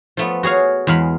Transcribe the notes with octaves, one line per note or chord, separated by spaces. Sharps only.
F3 A3 B3
F#4 G#4 C#5 F5
E2 G#3 F5 B5